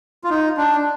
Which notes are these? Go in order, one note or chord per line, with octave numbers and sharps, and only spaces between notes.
F4
D#4
D4